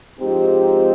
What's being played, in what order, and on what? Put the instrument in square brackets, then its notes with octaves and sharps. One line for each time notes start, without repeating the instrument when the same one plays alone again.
[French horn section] G#2 F3 G#3 C4 D#4 G4